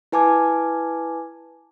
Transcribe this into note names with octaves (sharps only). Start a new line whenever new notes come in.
E4 B4 G#5 A5 D6 G#6